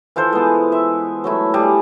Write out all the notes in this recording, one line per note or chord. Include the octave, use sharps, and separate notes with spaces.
E3 F4 A4 C5
G#3 B3
E5
F#3 A3 E4
G3 D4 G#4